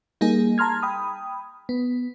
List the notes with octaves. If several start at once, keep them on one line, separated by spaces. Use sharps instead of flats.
G3 A#3 D#4 G#4
A5 A#5 C6 F6 G#6
G5 B5 D#6
B3